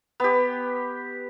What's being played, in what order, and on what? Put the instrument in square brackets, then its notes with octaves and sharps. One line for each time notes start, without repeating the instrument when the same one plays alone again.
[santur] B3 G4